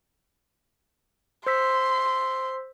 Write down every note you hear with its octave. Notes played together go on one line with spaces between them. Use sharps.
C5 C6 E6 B6